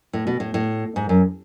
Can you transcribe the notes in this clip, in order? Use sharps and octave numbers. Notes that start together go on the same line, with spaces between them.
A2
B2
A2
A2
G#2
F#2